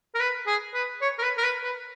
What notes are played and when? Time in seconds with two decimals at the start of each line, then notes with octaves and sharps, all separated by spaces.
0.15 A#4
0.20 B4
0.47 G#4
0.74 B4
1.02 C#5
1.19 A#4
1.22 B4
1.38 A#4
1.43 B4
1.64 B4